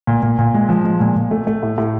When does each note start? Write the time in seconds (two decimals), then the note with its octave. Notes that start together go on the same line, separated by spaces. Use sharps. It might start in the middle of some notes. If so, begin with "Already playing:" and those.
0.07 A#2
0.23 A#2
0.39 A#2
0.54 G#3
0.69 F3
0.84 G#3
1.00 A#2
1.16 A#2
1.31 A3
1.47 A3
1.63 A2
1.78 A2